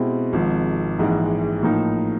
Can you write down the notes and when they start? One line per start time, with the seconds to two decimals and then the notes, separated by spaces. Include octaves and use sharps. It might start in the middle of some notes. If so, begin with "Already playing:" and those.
Already playing: B2 G#3 C4 E4 G4
0.33 G#1 G#2 F3
0.99 A#1 G#2 E3 G#3
1.63 A2 F3 A#3 D#4